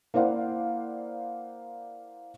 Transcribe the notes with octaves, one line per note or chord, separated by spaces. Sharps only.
A#3 E4 C5 D5 F5 F#5